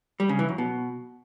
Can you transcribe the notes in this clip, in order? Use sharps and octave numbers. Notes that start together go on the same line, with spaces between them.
G3
C#3
E3
F#2
B2